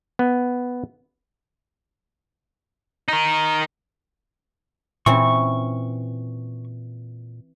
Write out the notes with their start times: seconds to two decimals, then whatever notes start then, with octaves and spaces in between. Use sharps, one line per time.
0.19 B3
3.08 D#4 A#4
5.06 A#2 E3 C4 C#4 C#6